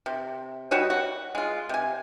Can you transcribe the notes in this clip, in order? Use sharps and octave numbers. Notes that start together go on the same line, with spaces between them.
C3
G3 F#4 C#5 D#5
F#4
G#3 F4
C3 G#5